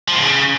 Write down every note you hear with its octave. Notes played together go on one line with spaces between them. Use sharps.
F3
A2
C#3